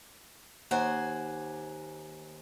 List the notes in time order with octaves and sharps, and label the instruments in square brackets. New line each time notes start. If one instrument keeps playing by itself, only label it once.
[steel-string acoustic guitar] D#2 C5 F#5 G#5